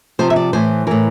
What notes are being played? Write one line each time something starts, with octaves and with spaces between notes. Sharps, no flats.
C3 F3 C5
E5
D5
A2 E3 C5
A2 E3 A#4